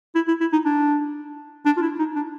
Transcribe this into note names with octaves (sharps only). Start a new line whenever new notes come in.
E4
E4
E4
D#4
D4
D4
F4
E4
D#4
D4